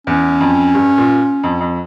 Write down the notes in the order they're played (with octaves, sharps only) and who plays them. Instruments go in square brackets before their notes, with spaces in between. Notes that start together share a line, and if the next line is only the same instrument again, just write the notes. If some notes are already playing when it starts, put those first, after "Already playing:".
[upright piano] E2 [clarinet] C#4
[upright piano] F2
G2
A#2
F2
F2